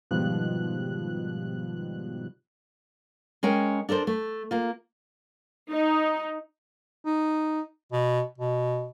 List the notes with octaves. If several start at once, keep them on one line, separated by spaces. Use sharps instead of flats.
G#2 B2 D#3 F3 G3 F#6
G#3 C#4 A#4 G5
D4 A4 A#4 C5
A3
A#3 F4
D#4
D#4
B2
B2